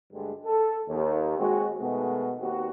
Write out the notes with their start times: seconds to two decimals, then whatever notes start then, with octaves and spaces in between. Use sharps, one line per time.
0.14 D2 G2 D3 G#3
0.46 A4
0.89 D#2
1.39 G#3 C4 F#4
1.80 B2 D#3 G#3 A3 F#4
2.41 D#2 C4 F#4